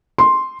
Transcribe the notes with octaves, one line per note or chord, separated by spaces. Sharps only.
C6